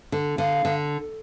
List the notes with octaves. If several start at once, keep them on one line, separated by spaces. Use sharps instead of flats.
D3
D3 F5
D3